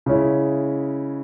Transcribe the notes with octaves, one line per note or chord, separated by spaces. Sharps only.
C#3 G#3 C#4 E4